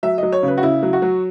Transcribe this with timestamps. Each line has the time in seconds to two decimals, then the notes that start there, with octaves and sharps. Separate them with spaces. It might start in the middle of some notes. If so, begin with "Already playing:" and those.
0.03 F#3 E5
0.18 F#3 D#5
0.32 C#5
0.43 C#3 B4
0.58 F#4
0.62 C#3 E4
0.83 F#3
0.93 F#4
1.02 F#3